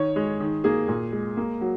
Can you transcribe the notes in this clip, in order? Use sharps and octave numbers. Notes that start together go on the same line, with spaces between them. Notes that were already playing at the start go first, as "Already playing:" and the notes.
Already playing: D#3 C#5
G#3
D#3
A#3 G#4
A#2
G#3
A#3
F#3